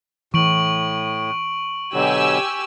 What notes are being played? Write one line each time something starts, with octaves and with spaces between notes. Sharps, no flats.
A2 E3 C#6 D7 F#7
B2 D3 F#3 G4 G#5 E6